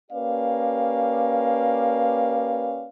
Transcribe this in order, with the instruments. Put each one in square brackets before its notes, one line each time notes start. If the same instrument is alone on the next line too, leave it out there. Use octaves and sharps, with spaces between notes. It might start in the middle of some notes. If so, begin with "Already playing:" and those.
[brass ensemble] A#3 C#4 G4 B4 D5 F5